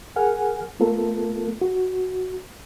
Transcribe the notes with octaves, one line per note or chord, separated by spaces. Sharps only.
G#4 A#4 F#5 G#5 F6
A3 B3 F4 A4 A#4
F#4